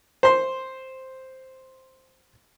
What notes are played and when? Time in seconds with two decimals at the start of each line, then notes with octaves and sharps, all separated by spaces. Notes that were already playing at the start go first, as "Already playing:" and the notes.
0.23 C5 C6